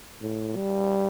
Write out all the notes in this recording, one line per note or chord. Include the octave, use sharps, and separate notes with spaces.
A2
G3